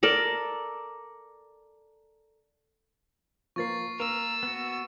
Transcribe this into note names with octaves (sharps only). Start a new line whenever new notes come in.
A4 A#4 D5
F3 A#3 C#6 A6 C7
A#3 A#4 E6
B3 F#4